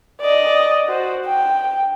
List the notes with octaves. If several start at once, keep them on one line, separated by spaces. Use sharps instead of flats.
D5 D#5
F#4 C5
G5